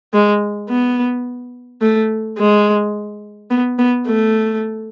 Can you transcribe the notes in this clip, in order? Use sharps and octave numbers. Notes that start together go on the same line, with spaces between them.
G#3
B3
A3
G#3
B3
B3
A3